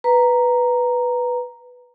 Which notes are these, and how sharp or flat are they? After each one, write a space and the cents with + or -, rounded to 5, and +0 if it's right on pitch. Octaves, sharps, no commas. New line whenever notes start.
B4 +0 A#5 +0